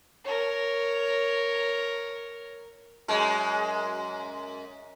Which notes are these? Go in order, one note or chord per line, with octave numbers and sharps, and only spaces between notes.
A#4 C#5
F#2 G#3